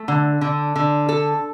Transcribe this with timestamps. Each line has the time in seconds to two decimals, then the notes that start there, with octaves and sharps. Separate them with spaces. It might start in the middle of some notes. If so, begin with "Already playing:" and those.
Already playing: A3
0.08 D3
0.41 D3
0.76 D3
1.09 A4